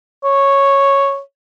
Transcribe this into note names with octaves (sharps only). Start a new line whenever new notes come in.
C#5